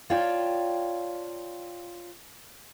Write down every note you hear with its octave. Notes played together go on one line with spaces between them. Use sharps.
F4 C#5 D5 F5 G5 A5